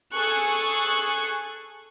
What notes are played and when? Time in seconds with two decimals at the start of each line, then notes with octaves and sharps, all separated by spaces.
0.13 G#4 A4 C#6 F#6